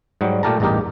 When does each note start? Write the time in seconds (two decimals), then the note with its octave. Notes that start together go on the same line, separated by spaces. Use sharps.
0.21 G#2 F#3 G3
0.43 A#2 A3 G4 A#4 A5 A#5
0.60 A1 E2 G2 D#4 G4 A#4